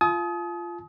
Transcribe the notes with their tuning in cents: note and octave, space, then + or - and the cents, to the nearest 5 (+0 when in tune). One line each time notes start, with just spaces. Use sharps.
F4 -10 A5 -45 D#6 +25